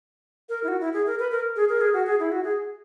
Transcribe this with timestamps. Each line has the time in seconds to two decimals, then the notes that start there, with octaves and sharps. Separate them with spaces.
0.49 A#4
0.64 E4
0.68 F#4
0.81 E4
0.93 G#4
1.06 A#4
1.19 B4
1.32 A#4
1.56 G#4
1.69 A#4
1.81 G#4
1.94 F#4
2.07 G#4
2.20 E4
2.32 F#4
2.44 G#4